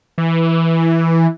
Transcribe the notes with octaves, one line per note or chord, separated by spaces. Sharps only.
E3